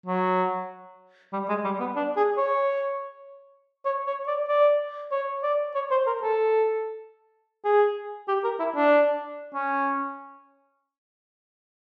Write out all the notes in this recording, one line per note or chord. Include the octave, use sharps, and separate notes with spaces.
F#3
G3
G#3
G3
B3
D4
G#4
C#5
C#5
C#5
D5
D5
C#5
D5
C#5
C5
A#4
A4
G#4
G4
A#4
E4
D4
C#4